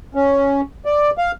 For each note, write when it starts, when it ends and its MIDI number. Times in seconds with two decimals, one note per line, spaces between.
0.15 0.61 61
0.85 1.10 74
1.18 1.31 77